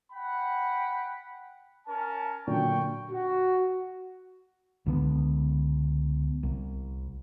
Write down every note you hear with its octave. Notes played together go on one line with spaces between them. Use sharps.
F#5 G5 B5
C#4 A#4 A5
A#2 D3 F#3 G5 C#6
F#4
C#2 D3 B3
C2